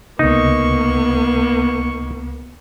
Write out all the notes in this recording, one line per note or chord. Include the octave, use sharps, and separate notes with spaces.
C#2 C3 A#3 B3 D#4 C#6